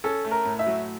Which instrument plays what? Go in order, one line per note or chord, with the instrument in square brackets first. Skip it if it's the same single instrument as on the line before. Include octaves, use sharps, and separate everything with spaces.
[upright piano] C#4 [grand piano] A4
[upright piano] A3
[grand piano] A#4
[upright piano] A2
[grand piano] E5
[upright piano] F#3